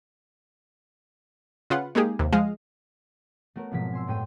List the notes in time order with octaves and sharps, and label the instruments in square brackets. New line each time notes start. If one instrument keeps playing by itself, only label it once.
[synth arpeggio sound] C#3 F4 B4 F#5
G#3 A#3 D#4 G4 G#4
D#2 C3
F3 G#3 D#5 F5
[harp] A3 B3 F#4 A#4 C#5
G#1 B2 F3 F#3 G#3 B6
G#5 C6 E6
G1 A2 G5 D#7